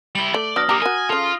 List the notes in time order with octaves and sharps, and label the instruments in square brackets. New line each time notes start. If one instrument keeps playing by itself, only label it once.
[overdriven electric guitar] G3 E4 [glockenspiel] F#7 G7
[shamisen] A3 [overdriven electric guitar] D5
[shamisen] F#3 B3 D4 [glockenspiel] D#6 F6 A#6
[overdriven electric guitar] A#3 D4 [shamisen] G4 A#5
[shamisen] F#4 A#4 [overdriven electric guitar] G#5
[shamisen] C#3 A4 [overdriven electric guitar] F4